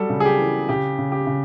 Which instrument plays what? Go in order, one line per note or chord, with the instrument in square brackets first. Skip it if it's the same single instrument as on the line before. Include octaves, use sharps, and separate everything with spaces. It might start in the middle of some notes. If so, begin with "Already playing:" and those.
Already playing: [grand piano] F#3 G3 A4
C#3
G#4
G4
E3
C#3 G4
C#3
G4
C#3